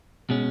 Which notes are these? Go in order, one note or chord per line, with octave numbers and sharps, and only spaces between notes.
B2 G#3 C#4